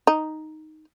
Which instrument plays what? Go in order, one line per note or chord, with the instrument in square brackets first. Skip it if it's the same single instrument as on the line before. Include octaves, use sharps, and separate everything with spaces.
[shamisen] D#4